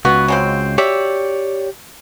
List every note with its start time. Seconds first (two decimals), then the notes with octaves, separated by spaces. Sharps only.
0.05 C#2 B3 F#4
0.28 C#3 G#3 C4
0.78 G4 C#5 D5 E5